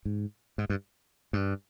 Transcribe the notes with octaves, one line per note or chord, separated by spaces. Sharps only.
G#2
G#2
G2
G2